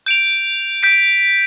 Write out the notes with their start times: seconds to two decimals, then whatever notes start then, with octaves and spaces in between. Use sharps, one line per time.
0.06 G6 D7 F7
0.83 G6 B6 D7